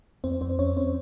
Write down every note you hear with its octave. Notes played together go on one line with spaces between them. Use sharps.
F2 C4 C5
F2 C4 C5
F2 C#4 C#5
C4 C5